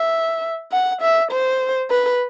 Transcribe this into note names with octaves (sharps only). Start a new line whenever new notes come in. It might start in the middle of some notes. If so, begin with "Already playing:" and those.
Already playing: E5
F#5
E5
C5
B4